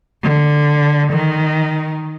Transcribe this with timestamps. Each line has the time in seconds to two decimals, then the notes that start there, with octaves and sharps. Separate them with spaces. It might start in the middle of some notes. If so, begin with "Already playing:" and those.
0.23 D3
1.12 D#3